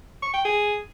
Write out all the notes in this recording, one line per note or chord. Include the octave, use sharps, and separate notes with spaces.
C#6
G5
G#4